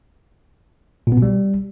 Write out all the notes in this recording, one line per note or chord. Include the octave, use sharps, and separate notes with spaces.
A#2
B3
B2
G3